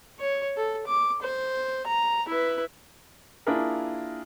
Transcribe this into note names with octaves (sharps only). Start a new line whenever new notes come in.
C#5
A4
D6
C5
A#5
E4 B4
A#3 D4 E4 F4 G#4 A#4